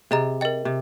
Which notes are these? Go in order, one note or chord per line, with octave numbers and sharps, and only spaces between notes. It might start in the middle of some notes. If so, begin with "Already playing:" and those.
C3 G#4 D#5 A#5
A#4 D#5 G5
C3